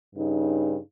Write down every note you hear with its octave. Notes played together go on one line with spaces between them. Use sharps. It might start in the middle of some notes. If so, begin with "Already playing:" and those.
G2 C#3 D#4